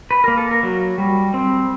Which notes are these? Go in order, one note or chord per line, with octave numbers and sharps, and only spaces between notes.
B4
A#3 A#4
A4
A#4
F#3
G3
C4